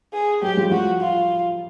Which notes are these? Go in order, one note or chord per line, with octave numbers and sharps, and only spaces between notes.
G#4
F#3 G#3 G4
F3 G3
F3 G3 F#4
F4